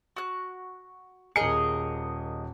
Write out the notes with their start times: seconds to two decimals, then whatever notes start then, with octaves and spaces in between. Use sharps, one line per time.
0.16 F#4 F#6
1.36 D#1 G#4 A#4 D#5 C#7